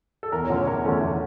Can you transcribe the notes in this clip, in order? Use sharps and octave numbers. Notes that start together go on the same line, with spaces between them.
A4
E2 A#4
C#5
D3 F3 A3 C#4
C#5
E2 A#4
D3 F3 A3 C#4
E2